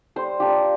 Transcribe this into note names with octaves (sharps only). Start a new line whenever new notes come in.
G3 C5
A#3 D4 F4 G4